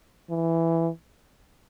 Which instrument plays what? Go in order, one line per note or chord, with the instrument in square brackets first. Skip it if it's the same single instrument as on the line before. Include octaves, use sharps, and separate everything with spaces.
[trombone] E3